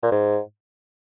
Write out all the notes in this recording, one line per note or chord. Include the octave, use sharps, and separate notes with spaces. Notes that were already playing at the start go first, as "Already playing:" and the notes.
A#2
G#2